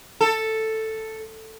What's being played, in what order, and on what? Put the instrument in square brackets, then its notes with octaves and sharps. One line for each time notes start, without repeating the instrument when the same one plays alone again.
[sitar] A4